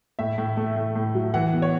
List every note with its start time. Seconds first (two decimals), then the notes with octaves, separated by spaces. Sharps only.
0.19 A2 E5
0.38 A2
0.57 A3
0.76 A2
0.95 A2
1.15 F#3
1.34 E3 F#5
1.53 B3
1.62 C#5